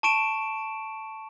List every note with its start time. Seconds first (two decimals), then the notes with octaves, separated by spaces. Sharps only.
0.03 A5 C#6 D7 E7